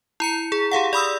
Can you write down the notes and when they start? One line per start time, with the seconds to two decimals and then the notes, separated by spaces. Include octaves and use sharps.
0.20 E4 A#5 C#7
0.52 G#4
0.72 G4 G#4 F5 F#5
0.93 D5 B5 D#6 E6